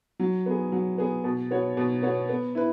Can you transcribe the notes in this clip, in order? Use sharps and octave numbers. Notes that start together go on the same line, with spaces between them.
F#3
B3 G#4
F#3
B3 G#4
B2
B3 F#4 C#5
B2
B3 F#4 C#5
B3
E4 B4